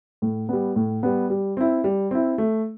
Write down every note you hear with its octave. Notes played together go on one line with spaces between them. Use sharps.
A2
G3 B3
A2
G3 B3
G3
C4 E4
G3
C4 E4
A3